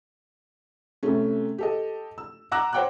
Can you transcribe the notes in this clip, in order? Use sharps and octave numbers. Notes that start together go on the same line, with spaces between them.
C3 A3 C#4
G4 A4 D#5
E6
F#5 A#5 D6 E6 F#6 A#6
C5 C#5 F#5 G5 D6 F#6